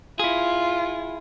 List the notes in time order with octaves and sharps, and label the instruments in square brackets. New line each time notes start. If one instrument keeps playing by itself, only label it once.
[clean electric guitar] E4 G#4 [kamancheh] F4